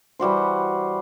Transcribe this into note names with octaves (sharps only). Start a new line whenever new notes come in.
E3 G3 F#4 C5